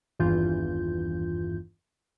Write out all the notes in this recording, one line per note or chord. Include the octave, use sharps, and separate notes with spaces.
G#1 E2 G2 E3 F4 G6